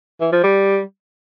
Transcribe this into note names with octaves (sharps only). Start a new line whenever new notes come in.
E3
F3
G3